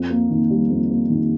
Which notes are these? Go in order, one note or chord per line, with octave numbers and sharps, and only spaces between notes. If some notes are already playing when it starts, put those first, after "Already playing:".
Already playing: F2
A#3
D#3
G3
F2
A#3
D#3